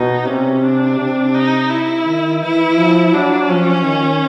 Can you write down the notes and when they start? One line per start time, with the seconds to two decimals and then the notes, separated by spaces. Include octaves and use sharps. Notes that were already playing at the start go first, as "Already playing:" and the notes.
Already playing: B2 D#4
0.26 C3 C#4
0.63 D4
0.98 C3
1.34 D#4
1.70 E4
2.06 D#3
2.42 E3 E4
2.77 F3
3.13 F#3 D4
3.49 F3 C#4
3.84 D#3